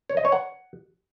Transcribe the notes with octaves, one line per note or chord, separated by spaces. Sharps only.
C#5
D#5
C#5
F#5